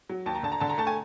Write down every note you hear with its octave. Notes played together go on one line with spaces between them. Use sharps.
F#3
D#2 A5
A#5
D3 A5
A#5
D3 A5
A#5
A3 A5
G#5